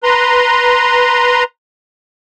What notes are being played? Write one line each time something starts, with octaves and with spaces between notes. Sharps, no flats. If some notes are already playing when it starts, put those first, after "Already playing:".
B4 A#5 C6